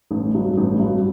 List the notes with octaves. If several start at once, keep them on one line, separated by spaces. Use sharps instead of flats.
A1
G2 F#3
A1
G2 F#3